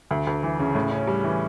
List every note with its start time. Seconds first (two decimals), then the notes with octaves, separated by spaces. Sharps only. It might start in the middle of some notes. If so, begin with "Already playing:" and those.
0.11 D2
0.27 D2
0.43 E3
0.59 C#3
0.75 A2
0.91 C#4
1.07 G3
1.24 E3